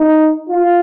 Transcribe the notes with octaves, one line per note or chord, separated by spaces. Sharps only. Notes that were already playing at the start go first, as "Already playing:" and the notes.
Already playing: D#4
F4